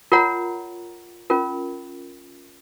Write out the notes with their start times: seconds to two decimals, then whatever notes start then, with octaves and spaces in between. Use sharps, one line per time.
0.12 F4 A#4 C#5 F#5 A#5
1.30 C#4 F4 A#4